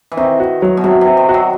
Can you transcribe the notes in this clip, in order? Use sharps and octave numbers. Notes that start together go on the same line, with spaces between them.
E3
D#3 C4
F#4
F#3
B2
C3 F#3
C3
C4
D#3
F#4
F#3